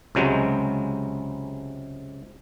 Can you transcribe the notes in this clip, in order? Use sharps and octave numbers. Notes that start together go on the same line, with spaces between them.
C#2 C3 F#3 G#3